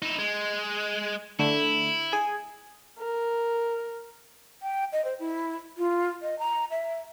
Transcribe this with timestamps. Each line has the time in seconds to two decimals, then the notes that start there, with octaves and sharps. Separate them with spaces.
0.02 D#4 E4
0.18 G#3
1.39 D3 A3 E4
2.12 G#4 G#5
2.99 A#4
4.62 G5
4.92 D#5
5.05 C5
5.20 E4
5.78 F4
6.22 D#5
6.39 A#5
6.71 E5